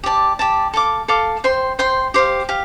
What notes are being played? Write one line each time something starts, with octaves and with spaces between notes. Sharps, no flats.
G4 D5 A5
G4 D5 A5
A4 F5 D6
A4 F5 D6
C5 G5 C6
C5 G5 C6
G4 C5 F5
G4 F5